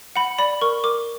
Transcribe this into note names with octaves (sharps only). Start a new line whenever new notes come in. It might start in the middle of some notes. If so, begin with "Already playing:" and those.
F#5 B5
D5 B5
A#4 C#6
A#4 D6